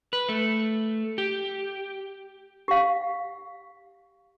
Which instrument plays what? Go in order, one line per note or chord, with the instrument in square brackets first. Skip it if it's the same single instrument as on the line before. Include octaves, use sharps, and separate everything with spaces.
[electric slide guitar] B4
A3
G4
[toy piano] G4 F5